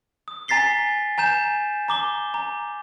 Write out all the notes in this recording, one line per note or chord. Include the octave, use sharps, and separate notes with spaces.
D#6
G#5 A#5 A6 B6 C7 G7
G#5 A#5 G6 E7
A#5 D6 G7
A#5